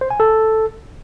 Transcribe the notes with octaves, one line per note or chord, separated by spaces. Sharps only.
C5
G#5
A4